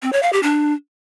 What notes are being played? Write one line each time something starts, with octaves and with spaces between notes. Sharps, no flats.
C4
C#5
F5
G4
D4